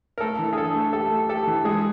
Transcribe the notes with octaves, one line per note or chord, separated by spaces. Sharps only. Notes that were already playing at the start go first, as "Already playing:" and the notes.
A#4
A3 A4
E3
G#4
D4 A4
A3
G4 A4
A3
G4 A4
E3
G#3 G#4